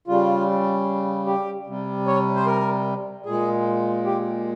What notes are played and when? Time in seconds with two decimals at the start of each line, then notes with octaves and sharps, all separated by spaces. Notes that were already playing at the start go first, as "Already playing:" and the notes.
0.08 C#3 G3 F4
1.26 G4
1.67 C3 G3
2.07 C#5
2.36 C5
2.46 A#4
3.26 A#2 G#3 G#4
4.05 G4